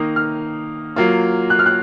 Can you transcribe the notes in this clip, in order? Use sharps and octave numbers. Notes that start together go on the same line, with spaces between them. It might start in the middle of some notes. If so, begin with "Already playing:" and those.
Already playing: D#3 A#3 D#4 D#6
F6
F#3 A#3 F4
F#6
F6
F#6